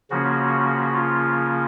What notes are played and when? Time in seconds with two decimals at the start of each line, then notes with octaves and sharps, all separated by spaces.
0.10 C#3 F3 A#3 C#4 F#4
0.94 F4